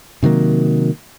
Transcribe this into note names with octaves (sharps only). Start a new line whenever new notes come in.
C3 D#3 F#3 A#3